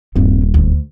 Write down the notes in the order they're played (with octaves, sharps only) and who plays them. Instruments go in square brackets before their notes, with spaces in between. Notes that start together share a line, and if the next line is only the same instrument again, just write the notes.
[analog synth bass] D#1 [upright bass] G2 C4
[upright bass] D2